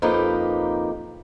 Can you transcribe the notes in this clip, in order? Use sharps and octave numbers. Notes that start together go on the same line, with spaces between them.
F2 A#3 D#4 G4 B4